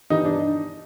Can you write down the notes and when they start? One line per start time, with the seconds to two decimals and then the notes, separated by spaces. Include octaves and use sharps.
0.10 G2 E3 G3 D#4
0.25 D4